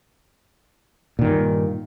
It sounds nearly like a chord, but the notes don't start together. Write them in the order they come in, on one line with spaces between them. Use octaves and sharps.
A#2 D#3 G2